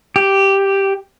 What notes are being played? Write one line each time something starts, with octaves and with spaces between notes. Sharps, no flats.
G4